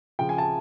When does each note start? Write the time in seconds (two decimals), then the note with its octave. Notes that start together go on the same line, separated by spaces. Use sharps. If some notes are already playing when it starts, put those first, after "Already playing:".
0.19 C#3 F3 G5
0.29 G#5
0.38 A5